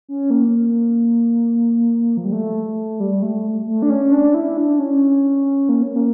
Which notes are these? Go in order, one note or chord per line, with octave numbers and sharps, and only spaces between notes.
C#4
A#3
F3
G3
A3
G3
A3
A3
D4
C#4
D4
E4
D4
C#4
A#3
C#4
A#3